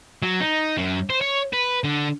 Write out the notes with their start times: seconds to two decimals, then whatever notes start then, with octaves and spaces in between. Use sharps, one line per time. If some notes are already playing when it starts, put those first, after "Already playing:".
0.22 F#3
0.41 D#4
0.77 F#2
1.10 C5
1.21 C#5
1.53 B4
1.84 D3